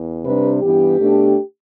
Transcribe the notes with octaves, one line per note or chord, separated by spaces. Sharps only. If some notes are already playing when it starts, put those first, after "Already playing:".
Already playing: E2
C3 G3 D4 B4
G2 E3 B3 G4
B2 A3 D4